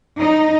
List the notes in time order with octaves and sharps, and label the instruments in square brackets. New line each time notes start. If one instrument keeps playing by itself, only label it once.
[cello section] D#4